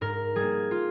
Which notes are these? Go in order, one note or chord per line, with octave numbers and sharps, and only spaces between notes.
G#2 A#4
G3 G#4
A#3
F4